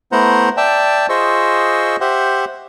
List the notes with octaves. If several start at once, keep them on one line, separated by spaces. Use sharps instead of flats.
A3 B3 E4 C5 F#5 A#5
D5 E5 G5 A5
F4 G#4 C5 D#5 C#6 E6
G4 C5 E5 F#5